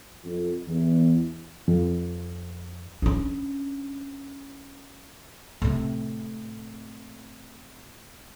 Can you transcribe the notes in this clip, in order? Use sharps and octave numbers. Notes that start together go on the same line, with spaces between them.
F2
E2
F2
C#4 D4
A2 C3